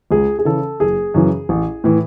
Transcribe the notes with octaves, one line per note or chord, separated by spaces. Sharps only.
C#2 G#4
G#4
C#3 E3 A4
F#1 G#4
F#2 C#3 E3
A1
A2 E3